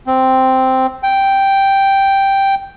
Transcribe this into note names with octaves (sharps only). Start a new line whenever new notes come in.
C4
G5